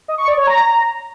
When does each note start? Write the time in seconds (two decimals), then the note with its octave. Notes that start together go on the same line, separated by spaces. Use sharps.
0.08 D#5
0.18 C#6
0.28 D5
0.37 C#5
0.47 A#5